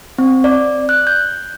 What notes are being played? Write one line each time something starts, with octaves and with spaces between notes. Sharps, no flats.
C4
D5
F#6
G6